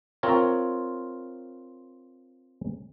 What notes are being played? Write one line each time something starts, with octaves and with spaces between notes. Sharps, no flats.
C4 F4 A#4 C#5